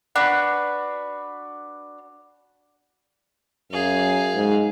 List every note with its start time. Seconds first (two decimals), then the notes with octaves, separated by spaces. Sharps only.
0.16 D4 F#4 B4 B5
3.71 F#2 G#4 F5
4.35 G#2